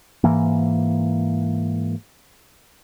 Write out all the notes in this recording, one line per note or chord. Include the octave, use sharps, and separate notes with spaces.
G#2 E3 A#3